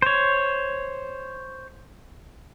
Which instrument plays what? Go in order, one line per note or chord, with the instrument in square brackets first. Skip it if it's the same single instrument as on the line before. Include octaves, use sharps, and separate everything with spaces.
[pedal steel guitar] C5 C#5